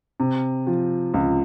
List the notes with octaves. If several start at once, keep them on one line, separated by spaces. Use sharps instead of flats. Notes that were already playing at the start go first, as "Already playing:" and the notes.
C3
F3
C#2